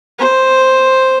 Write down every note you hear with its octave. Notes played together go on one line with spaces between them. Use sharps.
C5